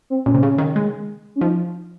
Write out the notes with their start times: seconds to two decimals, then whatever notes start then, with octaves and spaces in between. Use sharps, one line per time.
0.10 C4
0.26 A#2 C#4
0.35 C3
0.43 C#3
0.58 D#3
0.76 G#3
1.36 C#4
1.41 F3 D#4